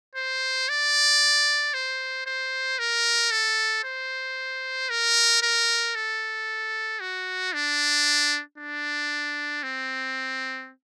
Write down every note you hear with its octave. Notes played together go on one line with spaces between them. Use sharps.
C5
D5
C5
C5
A#4
A4
C5
A#4
A#4
A4
F#4
D4
D4
C4